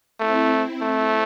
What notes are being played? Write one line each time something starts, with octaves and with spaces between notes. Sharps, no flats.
A3 C4 E4
A3